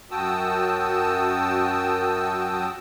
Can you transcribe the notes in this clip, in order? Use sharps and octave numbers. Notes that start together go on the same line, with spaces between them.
F#2 F#4 G5 A5 D#6 E6